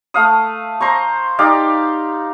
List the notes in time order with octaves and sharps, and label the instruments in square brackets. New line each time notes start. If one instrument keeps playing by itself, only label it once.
[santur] A3 F5 D#6
C5 A#5 C#6
D#4 G4 D5 F5